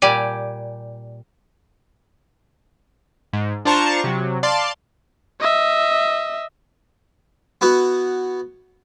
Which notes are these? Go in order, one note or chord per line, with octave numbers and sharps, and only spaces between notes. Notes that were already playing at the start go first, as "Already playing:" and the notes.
A#2 G3 G4 D5 G#5
G#2
D4 F4 C5 A5 A#5 C#6
C3 F#3
D5 F5 A5 C6
D#5 E5
B3 E4 F#4